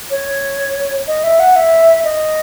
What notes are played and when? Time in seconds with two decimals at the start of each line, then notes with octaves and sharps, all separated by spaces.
0.10 C#5
1.07 D#5
1.24 E5
1.40 F#5
1.56 E5
2.04 D#5